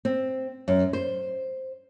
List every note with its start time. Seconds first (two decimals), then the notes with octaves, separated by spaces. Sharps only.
0.05 C4
0.68 F#2
0.93 C5